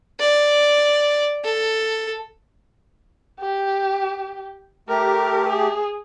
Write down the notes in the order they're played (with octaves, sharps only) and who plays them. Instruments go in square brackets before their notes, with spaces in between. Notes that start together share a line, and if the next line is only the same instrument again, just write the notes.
[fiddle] D5
A4
[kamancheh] G4
[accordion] A3 G4 [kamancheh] A#4
[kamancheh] G#4